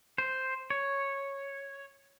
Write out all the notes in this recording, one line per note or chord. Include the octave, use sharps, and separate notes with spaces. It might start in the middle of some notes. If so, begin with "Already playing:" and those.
C5
C#5